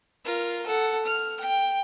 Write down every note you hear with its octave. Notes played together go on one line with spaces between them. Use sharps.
F4 A#4
A4 F#5
F6
G5